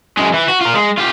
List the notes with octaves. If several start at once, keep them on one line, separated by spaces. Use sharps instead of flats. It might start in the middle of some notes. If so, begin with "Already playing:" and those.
F#2 G#3
E3
F#4
F4 A#4
G#3
F4 G4